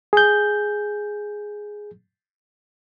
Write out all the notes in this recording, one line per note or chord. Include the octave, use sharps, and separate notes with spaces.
G#4 G6